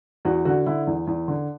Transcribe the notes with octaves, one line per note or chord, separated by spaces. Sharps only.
E2 F#4
D3 F#4
D3 E4
E2
E2
D3